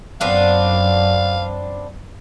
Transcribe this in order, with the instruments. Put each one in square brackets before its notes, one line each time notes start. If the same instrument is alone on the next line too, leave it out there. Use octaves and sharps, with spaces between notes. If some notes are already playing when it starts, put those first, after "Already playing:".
[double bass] F#2 [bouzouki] B3 C4 D4 [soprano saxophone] F5